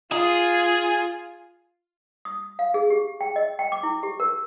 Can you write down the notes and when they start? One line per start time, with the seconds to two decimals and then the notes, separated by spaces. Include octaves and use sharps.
0.12 F4 G#4
2.25 D#6
2.59 F5
2.74 G#4
2.90 G4
3.21 G5
3.36 D#5
3.59 G5
3.72 D6
3.83 E4
4.03 G4
4.20 A#4